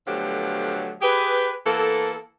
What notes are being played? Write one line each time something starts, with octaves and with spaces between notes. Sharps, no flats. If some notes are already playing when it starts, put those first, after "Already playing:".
B2 D3 F3 F#3 A3 G4
G4 G#4 B4
E3 A#3 B3 A4